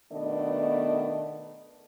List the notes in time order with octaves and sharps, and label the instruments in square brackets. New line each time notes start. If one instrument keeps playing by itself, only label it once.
[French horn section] B2 D#3 A3 B3 D4 D#5